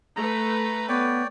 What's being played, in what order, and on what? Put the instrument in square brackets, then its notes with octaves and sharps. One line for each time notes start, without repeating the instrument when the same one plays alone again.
[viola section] A3 B4 [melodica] A#5
[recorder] B3 [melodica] C#5 D5 G5